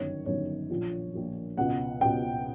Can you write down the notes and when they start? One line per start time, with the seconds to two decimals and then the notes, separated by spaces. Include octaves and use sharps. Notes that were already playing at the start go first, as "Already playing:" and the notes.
Already playing: G1 F#2 D#3 C#5
0.26 G1 F#2 D#3 C#5
0.70 A#1 A#2 F3
1.14 A#1 A#2 F3
1.57 C#2 B2 F#5
2.01 C#2 B2 G5